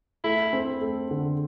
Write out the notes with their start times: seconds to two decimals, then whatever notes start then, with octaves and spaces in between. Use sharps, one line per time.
0.24 A3 E4
0.53 C4
0.81 A3
1.11 D3